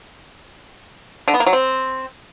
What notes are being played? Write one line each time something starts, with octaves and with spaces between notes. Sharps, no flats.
D3
B3
A#3
F#3
C4